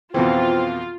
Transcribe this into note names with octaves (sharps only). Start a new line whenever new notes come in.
F2 B2 E3 C4 F4